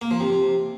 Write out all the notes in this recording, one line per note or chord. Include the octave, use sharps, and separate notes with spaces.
A#3
F3
C3